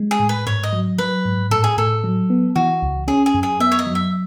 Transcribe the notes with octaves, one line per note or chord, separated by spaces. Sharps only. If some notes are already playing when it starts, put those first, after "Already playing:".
Already playing: G#3
G#4
A2
B4
G#2 C#5
D#5
F#3
F#3 B4
G#2
A2 A4
G#4
A2 A4
F#3
B3
E3 F#4
C#2
C#4 G#4
G#4
F#2
G#4
B3 E5
C#5
D#5
F#3
E5